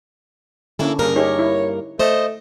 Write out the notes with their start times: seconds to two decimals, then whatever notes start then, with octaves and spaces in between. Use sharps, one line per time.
0.79 D3 A#3 C#4 E4 A4
0.99 G2 C#3 A#3 A#4
1.16 D#4 G4 G#4 C#5
1.39 E4
1.99 A3 C5 D#5